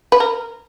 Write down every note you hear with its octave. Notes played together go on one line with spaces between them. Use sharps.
B4
A#4